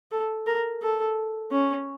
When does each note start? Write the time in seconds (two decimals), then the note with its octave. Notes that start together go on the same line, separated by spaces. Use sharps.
0.11 A4
0.47 A#4
0.82 A4
1.52 C#4